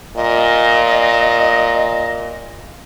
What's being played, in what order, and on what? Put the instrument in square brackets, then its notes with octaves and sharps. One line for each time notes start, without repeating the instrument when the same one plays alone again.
[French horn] A#2 [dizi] D#5